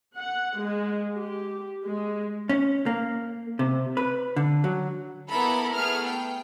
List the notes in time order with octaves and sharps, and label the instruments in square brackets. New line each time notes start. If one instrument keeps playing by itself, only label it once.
[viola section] F#5
G#3
G4
G#3
[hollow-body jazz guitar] C#4
A#3
C3
B4
D3
F#3
[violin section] A#3 B3 E4 A4 A#4 B5
A3 B3 G#4 F6
G5